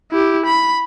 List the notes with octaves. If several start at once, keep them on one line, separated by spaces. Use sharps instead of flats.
E4 G4
B5